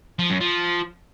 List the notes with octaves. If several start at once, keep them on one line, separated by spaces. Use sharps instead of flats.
F3
F#2
F3